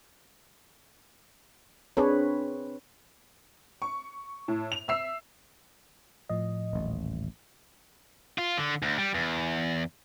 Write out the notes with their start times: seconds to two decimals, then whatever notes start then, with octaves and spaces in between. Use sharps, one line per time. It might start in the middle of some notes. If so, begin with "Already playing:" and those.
1.97 C4 D4 G#4 B4 C#5
3.82 C#6
4.48 A2
4.72 F7
4.88 E5 E6 C7
6.29 A2 F3 D#5
6.73 D#1 A1
8.38 F4
8.57 D3
8.83 D2
8.98 G3
9.14 E2